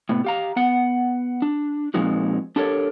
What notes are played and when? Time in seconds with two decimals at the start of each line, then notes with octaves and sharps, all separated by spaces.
0.09 A2 C3 B3
0.25 G4 F5 A#5
0.56 B3 F#5
1.42 D4
1.94 A#2 F3 G#3 C4 D#4 F#4
2.56 D4 G4 A4 A#4 C#5